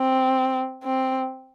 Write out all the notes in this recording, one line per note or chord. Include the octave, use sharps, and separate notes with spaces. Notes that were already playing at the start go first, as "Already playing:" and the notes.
Already playing: C4
C4